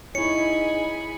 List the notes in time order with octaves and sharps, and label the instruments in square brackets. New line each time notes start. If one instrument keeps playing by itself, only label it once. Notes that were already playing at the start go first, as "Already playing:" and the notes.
[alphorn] D#4 [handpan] E4 C#5 [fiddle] G#4 B5 [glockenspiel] C#7